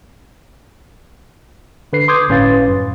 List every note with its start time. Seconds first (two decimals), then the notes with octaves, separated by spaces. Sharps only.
1.93 D3 B4 C7
2.08 C6 D6 D#6 G6 G#6
2.29 G1 A2 C#4 B4 F5 A6
2.68 F#2